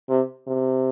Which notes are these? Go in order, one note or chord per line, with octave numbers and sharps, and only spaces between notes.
C3
C3